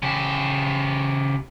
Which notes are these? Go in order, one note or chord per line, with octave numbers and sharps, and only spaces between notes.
C#3 G4